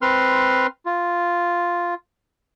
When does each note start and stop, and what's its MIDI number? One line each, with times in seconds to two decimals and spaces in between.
0.02 0.67 60
0.02 0.67 71
0.02 0.67 84
0.02 0.67 89
0.86 1.94 65